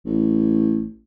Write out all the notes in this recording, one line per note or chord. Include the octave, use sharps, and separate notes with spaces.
A1